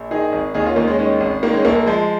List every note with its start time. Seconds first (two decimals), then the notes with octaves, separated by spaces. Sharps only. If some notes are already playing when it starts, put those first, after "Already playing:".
Already playing: A#1
0.11 D#3 D#4 G#4
0.32 G#1
0.54 D#2 D#4 G#4
0.66 C#4 F4
0.76 D#2 A#3 D#4
0.87 G#3 C#4
0.99 D#3 G#3 C#4
1.20 G#1
1.43 D#3 A#3
1.53 G#3 C#4
1.65 A#1 A#3
1.75 A#3
1.86 F3 G#3